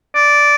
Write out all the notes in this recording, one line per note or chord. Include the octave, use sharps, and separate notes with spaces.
D5